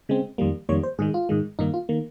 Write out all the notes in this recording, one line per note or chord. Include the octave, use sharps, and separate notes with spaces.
C#3 G#3 C4
F2 D#3 G3 A#3
F2 D#3 G3 A#3 C#5
C5
G#2 D#3 G#3 G#4
F4
G#2 D#3 G#3
G2 D#3 A#3 D#4
F4
D#3 A#3